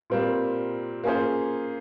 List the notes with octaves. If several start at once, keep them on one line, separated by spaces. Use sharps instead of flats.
A#2 G3 C4 F4 A#4
A#3 C#4 F4 G#4 C5